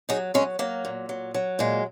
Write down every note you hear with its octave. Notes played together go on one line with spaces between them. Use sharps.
F#3 D#4 G#4
F#3 G#3 C#4
F#3 A#3
A#2
F#3
F#3
A#2 G#3